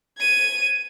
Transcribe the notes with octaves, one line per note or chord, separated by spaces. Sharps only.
G#6 D#7